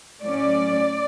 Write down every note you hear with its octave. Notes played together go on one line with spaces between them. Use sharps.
A2 F#3 C#4 D5